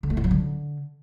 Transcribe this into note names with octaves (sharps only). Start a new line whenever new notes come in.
D3
A3
A2
F#3
D3